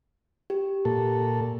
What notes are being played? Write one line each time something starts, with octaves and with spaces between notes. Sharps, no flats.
G4
A#2 A4